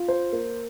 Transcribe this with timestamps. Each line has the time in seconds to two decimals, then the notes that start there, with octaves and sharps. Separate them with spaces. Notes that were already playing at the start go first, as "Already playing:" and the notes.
Already playing: F4
0.08 C5
0.33 A#3